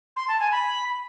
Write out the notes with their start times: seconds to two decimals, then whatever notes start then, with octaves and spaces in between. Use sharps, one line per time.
0.16 C6
0.28 A5
0.40 G#5
0.52 B5